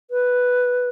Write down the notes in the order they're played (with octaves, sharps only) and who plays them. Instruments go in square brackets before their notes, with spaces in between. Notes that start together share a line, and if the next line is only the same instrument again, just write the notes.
[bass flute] B4